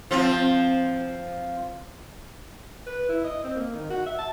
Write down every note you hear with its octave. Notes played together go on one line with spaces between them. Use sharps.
F3 C4 F4
B4
E4
D#5
C4
A#3
D#3
F#4
E5
A5